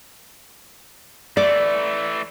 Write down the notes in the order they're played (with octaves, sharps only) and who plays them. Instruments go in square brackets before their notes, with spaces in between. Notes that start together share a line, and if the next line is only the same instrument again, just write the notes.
[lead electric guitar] E3 A3 [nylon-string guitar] D5